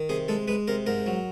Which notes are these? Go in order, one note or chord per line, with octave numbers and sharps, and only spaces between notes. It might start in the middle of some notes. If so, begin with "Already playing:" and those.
Already playing: D#3
C3 G#4
G#3 A4
G#3 B4
C3 A#4
G#2 A#4
F#3